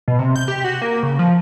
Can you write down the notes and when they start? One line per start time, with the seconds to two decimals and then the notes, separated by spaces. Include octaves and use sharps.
0.08 B2
0.19 C3
0.36 G6
0.48 G4
0.64 F#4
0.82 A#3
1.03 C#3
1.19 F3